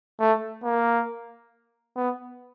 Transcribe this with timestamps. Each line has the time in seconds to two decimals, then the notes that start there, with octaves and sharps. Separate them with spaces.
0.20 A3
0.63 A#3
1.96 B3